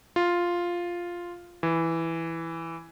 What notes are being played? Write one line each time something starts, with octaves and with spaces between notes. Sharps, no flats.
F4
E3